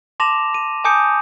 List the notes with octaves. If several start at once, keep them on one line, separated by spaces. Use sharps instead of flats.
A5 C6 D6 A#6 E7 F7
D#7
G#5 A5 D6 D#6 G6 C#7